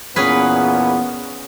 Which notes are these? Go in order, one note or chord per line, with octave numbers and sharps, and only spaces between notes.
E2 A#2 B3 C#4 G#4 B4